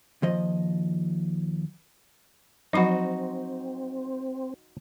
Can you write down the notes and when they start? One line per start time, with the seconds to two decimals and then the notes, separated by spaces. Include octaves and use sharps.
0.22 D#2 F3 D#5
2.73 F3 F#3 C4 D#4 F#4 B5